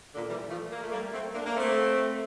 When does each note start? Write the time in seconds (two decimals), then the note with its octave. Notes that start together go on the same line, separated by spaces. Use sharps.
0.15 A#2 D3
0.29 E3 G3
0.49 F3 A3
0.71 A#3
0.82 A3
0.92 G3 A#3
1.13 A3 C4
1.34 A#3 D4
1.46 A#3
1.56 A3 C4